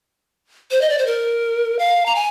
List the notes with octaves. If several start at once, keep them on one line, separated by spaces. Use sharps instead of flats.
C5
D#5
D5
C5
A#4
F5
A#5
G#5